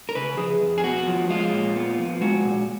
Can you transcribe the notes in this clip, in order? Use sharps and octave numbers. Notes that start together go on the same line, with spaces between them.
A#4
C#3 B4
F3 G#4
F2
G#4
B3 F#4
F3
G#3 F4
A#2
B3
F3
G#3 F#4
A#2